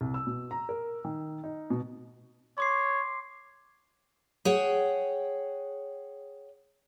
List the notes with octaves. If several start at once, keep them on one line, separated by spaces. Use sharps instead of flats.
C2
E6
B2
A#5
A#4
D#3
D#4
B2
C#5 C6 D6 C7
G#4 C#5 F#5 G5